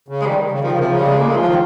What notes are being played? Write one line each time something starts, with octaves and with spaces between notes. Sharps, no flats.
C#3
G#3
D#3 G3
C#3
D#3 F3
C#3
C3
F3
C#3
G3
G#3
A#3
G#3
F3 F4
D#3